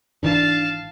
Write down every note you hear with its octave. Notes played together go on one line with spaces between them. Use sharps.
G#1 D#3 E3 D4 F5 A5